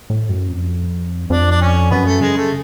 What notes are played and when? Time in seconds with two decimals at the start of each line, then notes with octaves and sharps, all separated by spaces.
0.10 A2
0.29 F#2
0.50 F2
1.30 F2 D4
1.51 D4
1.61 C#4
1.90 F#2 B3
2.06 A3
2.21 C#3 G#3
2.37 A3